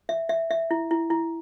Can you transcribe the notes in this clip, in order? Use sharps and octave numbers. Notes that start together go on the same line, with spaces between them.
E5
E5
E5
E4
E4
E4